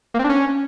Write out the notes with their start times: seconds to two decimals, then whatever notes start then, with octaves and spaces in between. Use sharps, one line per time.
0.14 A#3
0.19 C4
0.24 D4
0.29 C#4